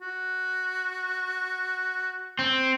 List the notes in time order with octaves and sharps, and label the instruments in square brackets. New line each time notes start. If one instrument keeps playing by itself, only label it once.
[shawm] F#4
[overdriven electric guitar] C4